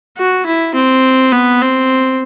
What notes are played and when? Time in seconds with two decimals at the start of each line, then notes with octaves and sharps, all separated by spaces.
0.18 F#4
0.46 E4
0.75 C4
1.32 B3
1.62 C4